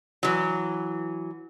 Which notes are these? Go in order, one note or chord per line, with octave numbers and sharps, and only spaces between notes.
E3 F#3